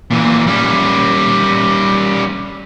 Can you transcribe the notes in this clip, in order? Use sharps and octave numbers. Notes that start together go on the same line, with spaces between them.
A#2 E3
G3 C#4